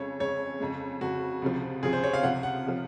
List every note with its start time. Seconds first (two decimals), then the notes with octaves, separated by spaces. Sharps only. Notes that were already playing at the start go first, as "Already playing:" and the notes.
Already playing: F2 C#3 G#3 C#5
0.20 F2 C#3 G#3 C#5
0.60 F2 C#3 G#3
1.01 F2 C#3 G#3 F#4
1.42 C#2 C3 F3
1.83 C#2 C3 F3 G#4
1.93 C5
2.03 C#5
2.14 F5
2.23 C#2 C3 F3 F#5
2.43 F#5
2.66 C3 F3